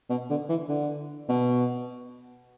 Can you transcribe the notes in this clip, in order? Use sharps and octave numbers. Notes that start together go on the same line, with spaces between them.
B2
D3
E3
D3
B2